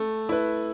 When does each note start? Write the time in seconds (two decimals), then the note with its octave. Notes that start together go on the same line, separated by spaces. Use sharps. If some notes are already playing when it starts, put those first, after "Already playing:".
Already playing: A3
0.29 E4 B4